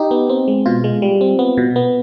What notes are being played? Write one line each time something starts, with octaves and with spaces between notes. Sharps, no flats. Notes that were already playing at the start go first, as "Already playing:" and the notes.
Already playing: D#4 G4
B3
C4
G#3
B2 F4
G#3
G3
C4
B3
B2
B3